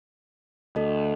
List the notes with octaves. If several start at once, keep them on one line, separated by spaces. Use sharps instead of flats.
D2 A4 D#5